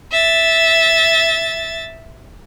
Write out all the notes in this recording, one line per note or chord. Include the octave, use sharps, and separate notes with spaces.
E5 A6